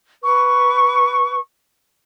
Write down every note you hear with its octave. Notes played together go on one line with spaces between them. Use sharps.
B4 C#6